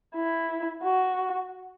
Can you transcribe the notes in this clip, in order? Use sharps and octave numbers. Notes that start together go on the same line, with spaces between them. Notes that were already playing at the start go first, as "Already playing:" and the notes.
E4
F#4